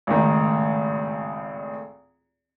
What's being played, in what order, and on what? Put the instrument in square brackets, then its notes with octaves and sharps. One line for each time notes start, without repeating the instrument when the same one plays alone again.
[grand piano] G#1 C#2 A2 D#3